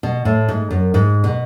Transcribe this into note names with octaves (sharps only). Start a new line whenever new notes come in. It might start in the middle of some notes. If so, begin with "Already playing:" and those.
B2
A2
G#2
F#2
G#2
B2